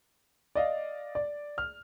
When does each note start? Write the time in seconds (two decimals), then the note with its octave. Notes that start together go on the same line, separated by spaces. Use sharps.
0.55 D5 D#5 F5
1.15 D5
1.58 F6